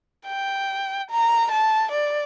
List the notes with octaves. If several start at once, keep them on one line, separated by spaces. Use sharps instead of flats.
G5
A#5
A5
D5